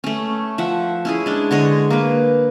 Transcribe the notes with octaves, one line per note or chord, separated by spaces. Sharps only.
A3 C#4
F3 E5 F#5
C#4 E4 G#4
G#3 D4
D3 G#3 C#5 D#5
A#3 B4